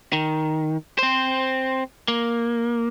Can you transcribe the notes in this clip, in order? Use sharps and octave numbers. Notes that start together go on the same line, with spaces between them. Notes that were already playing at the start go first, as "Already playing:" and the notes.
D#3
C4 C5
A#3